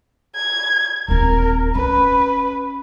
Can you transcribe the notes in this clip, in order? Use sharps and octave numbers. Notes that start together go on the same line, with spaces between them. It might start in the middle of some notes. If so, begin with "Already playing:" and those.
G#6
D#1 C4 A#4
C#4 B4